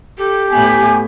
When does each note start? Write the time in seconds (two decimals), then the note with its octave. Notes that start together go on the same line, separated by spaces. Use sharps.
0.18 G4 A4
0.51 A2 A3 B3 G#5